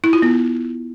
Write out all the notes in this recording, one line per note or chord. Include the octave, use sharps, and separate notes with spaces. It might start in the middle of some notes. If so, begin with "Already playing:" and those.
E4
F4
B3